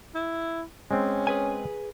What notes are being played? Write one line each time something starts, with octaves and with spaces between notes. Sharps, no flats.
E4
G#3 C4 C#4
G#4 B4 G#5